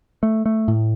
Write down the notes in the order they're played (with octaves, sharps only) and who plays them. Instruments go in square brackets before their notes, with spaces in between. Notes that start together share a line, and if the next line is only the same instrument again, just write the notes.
[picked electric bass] A3
A3
A2